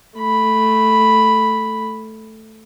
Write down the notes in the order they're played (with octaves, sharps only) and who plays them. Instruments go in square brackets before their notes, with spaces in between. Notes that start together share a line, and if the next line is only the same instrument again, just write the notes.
[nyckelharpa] A3 B5